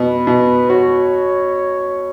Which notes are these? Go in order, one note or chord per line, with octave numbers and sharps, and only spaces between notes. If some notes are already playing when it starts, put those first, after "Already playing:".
Already playing: B2 B4
B2
F#4 C#5